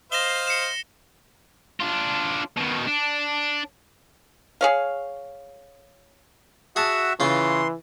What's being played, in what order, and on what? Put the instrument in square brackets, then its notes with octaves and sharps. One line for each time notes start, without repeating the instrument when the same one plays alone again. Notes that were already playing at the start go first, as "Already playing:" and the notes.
[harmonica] C5 D#5 F5 [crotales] A#6 E7 G7
[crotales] C#7 E7
[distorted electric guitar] D4 F4
B2 D#3
D4
[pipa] G#4 C#5 F5
[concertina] F#4 E5 F#5 [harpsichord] G#4 G#5 A5
[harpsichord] C#3 C#4 F4 [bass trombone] E3 [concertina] C6